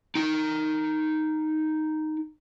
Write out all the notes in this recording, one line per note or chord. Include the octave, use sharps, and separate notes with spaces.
D#4 G5